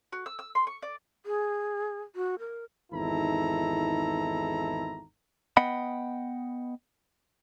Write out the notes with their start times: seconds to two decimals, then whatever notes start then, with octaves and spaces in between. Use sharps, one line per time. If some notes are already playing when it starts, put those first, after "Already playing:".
0.12 F#4
0.26 E6
0.39 E6
0.55 C6
0.67 C#6
0.83 D5
1.26 G#4
2.15 F#4
2.39 A#4
2.92 G#1 E2 D#4 E4 A4 A#5
5.57 B3 D#5 F#5 G5 B5